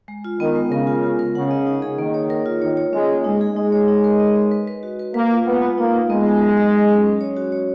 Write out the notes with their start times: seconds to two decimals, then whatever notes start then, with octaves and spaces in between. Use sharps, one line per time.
0.08 G#3
0.24 F4
0.40 D#3 B3
0.56 G#3
0.71 C#3 A#4
0.87 F4
1.03 F4
1.19 A#4
1.35 C#3 F#5
1.51 D#5
1.66 D#4
1.82 G#4
1.98 D#3 A#3
2.14 C#5
2.30 A#4
2.46 F4
2.61 D#3 C#5
2.77 C#5
2.93 G#3 C#4
3.09 A#3
3.24 G#3 D#4
3.41 G#4
3.56 G#3 D#4
3.72 C#5
3.88 D#4
4.04 A#4
4.20 D#5
4.36 D#5
4.51 B4
4.68 B4
4.83 F#4
4.99 B4
5.14 A#3 B4
5.31 F4
5.46 G#3 B3
5.62 F4
5.78 A#3 D#4
5.94 D#4
6.10 G#3 B3
6.26 D#4
6.41 F#3
6.57 D#5
6.73 F#3
6.89 C#4
7.04 C#4
7.21 C#5
7.36 F#4
7.52 C#5